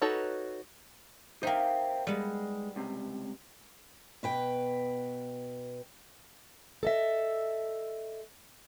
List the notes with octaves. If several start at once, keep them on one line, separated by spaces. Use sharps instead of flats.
D#4 F#4 A4 B4 C#5
A#3 D#4 C5 E5 G5
G3 G#3 B3
C#2 C3
B2 B4 G5
A4 D#5 E5